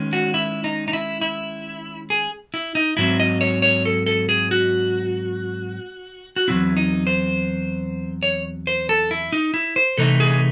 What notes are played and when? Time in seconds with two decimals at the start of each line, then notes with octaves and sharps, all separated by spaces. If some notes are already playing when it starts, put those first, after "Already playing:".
Already playing: D#3 G#3 C#4
0.13 F#4
0.34 E4
0.64 D#4
0.88 D#4
0.93 E4
1.21 E4
2.10 G#4
2.54 E4
2.75 D#4
2.97 G#2 F#3 C4 E4
3.20 D#5
3.41 C#5
3.62 C#5
3.85 A4
4.06 A4
4.29 G#4
4.51 F#4
6.36 F#4
6.48 E2 C#3 F#3 C4 E4
6.77 D#4
7.07 C5
8.23 C#5
8.67 C5
8.89 A4
9.11 E4
9.33 D#4
9.54 E4
9.76 C5
9.98 C3 E3 A3 D#4 A4
10.20 G#4